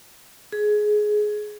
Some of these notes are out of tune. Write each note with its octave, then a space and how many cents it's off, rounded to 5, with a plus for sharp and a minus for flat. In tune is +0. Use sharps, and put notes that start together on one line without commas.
G#4 +15